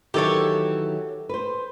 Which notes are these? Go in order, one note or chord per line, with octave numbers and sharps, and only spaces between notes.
D#3 E3 F#3 G4 A4 C#5
B4 C5